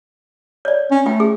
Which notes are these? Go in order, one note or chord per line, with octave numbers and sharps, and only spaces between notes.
C#5 D5
C#4
A3 F4 G5
G#4